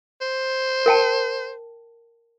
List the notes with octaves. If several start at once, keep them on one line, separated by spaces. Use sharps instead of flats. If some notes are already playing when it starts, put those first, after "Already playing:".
C5
A#4 G5 A5